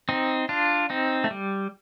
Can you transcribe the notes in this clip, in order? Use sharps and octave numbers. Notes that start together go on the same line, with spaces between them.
C4 D#4
D4 F4
C4 D#4
A3
G3